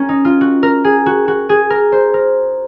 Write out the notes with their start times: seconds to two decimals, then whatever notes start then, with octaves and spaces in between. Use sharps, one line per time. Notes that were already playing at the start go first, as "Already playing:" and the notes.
Already playing: C#4 A#4
0.09 D#4
0.25 F4
0.41 F#4
0.63 A#4
0.84 G#4
1.06 F#4
1.28 F#4
1.49 G#4
1.70 A#4
1.92 C5
2.14 A#4